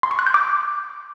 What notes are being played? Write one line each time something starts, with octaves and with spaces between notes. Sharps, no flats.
C6
C#6
F#6
G6
D6